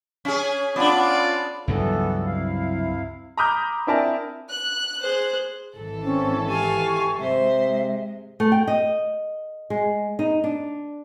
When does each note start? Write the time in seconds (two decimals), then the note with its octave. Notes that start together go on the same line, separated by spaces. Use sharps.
0.25 C#4 G#4
0.76 B3 C#4 D4 F4 D5
1.68 C#2 G2 E3 F#3 B3 A4
2.27 C3 E4 F5
3.37 A#5 B5 D6 D#6 F6 G6
3.87 C4 D4 E4 A#4 G#5 A5
4.49 F#6
5.00 G#4 C5
5.74 G#1 E3 A4
6.04 C4 C#4
6.49 G4 F5 G#5 C#6
7.19 C3 G#3 C5 E5
8.40 A3
8.52 G5
8.67 D#5
9.70 G#3
10.19 D#4
10.44 D4